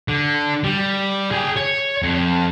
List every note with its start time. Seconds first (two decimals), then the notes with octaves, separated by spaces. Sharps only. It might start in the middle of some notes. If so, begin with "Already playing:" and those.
0.08 D3
0.64 G3
1.32 G#4 G5
1.57 C#5
2.03 F2